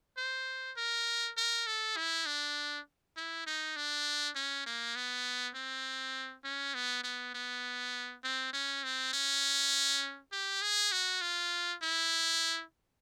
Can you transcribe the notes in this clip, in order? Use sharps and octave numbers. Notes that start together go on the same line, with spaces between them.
C5
A#4
A#4
A4
E4
D4
E4
D#4
D4
C#4
A#3
B3
C4
C#4
B3
B3
B3
C4
C#4
C4
C#4
G4
G#4
F#4
F4
E4